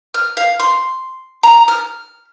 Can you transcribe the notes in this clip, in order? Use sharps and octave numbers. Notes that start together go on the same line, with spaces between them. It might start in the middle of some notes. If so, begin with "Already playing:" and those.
F6
F5
C6
A#5
F6